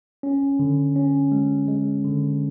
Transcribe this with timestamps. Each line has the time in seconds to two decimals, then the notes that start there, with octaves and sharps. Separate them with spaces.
0.23 C#4
0.59 D3
0.96 C#4
1.32 G#3
1.68 G#3
2.04 D3